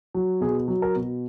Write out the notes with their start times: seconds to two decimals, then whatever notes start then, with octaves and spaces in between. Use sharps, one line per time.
0.15 F#3
0.41 B2 G#4
0.68 F#3
0.82 A#4
0.96 B2